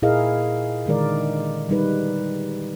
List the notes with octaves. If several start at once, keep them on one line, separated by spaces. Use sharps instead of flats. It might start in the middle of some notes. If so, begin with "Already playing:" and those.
A#2 E4 G#4 A#4 D#5 F5
D3 D#3 G#3 A#4 D5
G3 D#4 B4